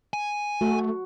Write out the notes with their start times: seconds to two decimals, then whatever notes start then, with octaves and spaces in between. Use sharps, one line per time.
0.13 G#5
0.61 A3 F#4